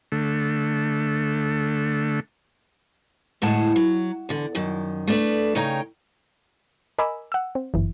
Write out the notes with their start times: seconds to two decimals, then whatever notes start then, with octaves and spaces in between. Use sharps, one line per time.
0.12 D3 A3
3.42 D2 A2 G#3 F#5 A5
3.76 F#3
4.29 E2 D3
4.55 F#2 D#3
5.08 A3 D4 B4
5.55 C#3 D#4 C#5 G5 A#5
6.98 A#4 D#5 G#5 B5 D6 E6
7.32 F#5 E6
7.55 C4
7.74 G1 F#2 E3